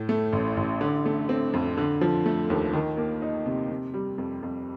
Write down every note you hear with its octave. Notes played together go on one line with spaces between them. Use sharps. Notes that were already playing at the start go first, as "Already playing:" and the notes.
Already playing: A2
A3
A1
A1
D3
A3
C4
F2
D3
F3
A3
D#2
D#3
A#3
D#4
C3
C3
G3
F2
F2